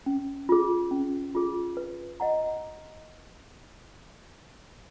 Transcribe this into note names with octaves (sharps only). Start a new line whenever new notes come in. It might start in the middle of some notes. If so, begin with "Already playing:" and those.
C#4
F4 G#4
C#4
F4 G#4
B4
D#5 F#5 A#5